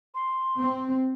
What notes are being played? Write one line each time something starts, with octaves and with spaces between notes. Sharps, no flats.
C6
C4